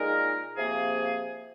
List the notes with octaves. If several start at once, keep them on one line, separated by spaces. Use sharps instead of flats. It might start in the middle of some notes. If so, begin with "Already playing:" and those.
Already playing: A#2 G#3 D#4 A#4
C3 F3 A#3 G#4